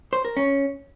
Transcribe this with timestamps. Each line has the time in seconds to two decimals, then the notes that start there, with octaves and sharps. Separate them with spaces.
0.13 C5
0.25 A#4
0.37 C#4